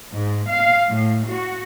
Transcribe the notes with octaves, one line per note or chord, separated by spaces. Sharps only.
G#2
F5
A2
F#4